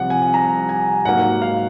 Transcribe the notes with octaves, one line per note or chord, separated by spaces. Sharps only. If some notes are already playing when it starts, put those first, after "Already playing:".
Already playing: C2 C3 F3 F#5
G#5
A#5
G#5
G#2 F#3 A#3 F#5
F5